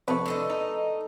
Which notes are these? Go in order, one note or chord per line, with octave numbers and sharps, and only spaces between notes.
C2 F2 C3 B4 A5 C#6
D3 A3 A4 D#5
D#4